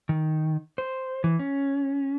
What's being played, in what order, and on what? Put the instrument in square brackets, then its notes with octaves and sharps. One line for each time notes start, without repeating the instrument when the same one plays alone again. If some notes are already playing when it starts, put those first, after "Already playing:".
[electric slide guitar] D#3
C5
E3
C#4